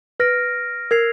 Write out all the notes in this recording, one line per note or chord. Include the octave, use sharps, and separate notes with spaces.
B4 F6 A#6 D7
A#4 E6 G#6 C7 F7